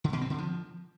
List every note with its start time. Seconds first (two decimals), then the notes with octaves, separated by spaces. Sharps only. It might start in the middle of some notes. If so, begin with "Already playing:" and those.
0.04 D3
0.13 B2
0.21 C4
0.30 D3
0.38 F3